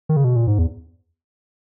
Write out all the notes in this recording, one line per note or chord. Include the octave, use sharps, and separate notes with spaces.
D#3
C#3
B2
A#2
G#2
E2